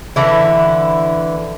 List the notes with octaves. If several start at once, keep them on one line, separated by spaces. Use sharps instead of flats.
D3 E3 E4